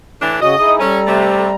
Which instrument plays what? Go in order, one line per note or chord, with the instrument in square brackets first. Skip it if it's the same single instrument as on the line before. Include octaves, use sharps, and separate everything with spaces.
[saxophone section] A2 E3 D4
[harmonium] C#3 C#4 F#4 [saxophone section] D#5 [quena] D#6
[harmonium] D#4 E4 G#4 [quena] D#6
[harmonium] G3 A#5 [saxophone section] C#4 [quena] A4
[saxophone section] C3 A3